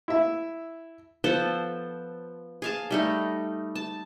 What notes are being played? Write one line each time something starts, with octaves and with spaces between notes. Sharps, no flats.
E4 E5
F3 B3 A4 C5
G#4 F5 A5
G3 A3 D#4
A5